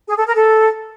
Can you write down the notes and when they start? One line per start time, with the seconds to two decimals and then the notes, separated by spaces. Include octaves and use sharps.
0.08 G#4
0.17 A4
0.25 A#4
0.34 A4